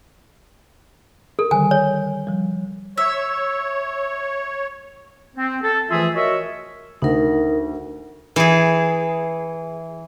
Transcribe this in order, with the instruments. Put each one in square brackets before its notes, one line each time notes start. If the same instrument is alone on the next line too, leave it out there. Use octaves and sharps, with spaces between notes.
[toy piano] A4 [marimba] A#4
[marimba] D3 D#3 G3 [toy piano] G#5
[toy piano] C#5
[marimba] F3 G3
[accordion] C#5 [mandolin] E5
[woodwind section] C4
A4
E3 F3 A3 F4 G#4 E5
F#4 A#4 C#5 D#5 E5
[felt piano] D2 [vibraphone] D#4 A#4
[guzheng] E3 G#4